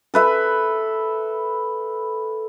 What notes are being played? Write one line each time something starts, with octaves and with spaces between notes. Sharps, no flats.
A4 B4 E5